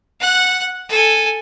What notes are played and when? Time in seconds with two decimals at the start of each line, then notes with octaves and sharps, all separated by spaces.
0.20 F#5 F#6
0.89 A4 G#5